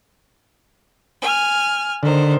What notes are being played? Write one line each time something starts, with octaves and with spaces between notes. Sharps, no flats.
G#5 F6
D3 D#3 C5